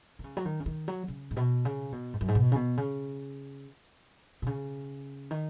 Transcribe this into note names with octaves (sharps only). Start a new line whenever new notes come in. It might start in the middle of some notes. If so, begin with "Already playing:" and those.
D#3
C#3
F#3
D#3
C#3
D#3
F#3
C#3
G#2
B2
C#3
B2
G#2
F#2
G#2
B2
C#3
B2
C#3
B2
C#3
D#3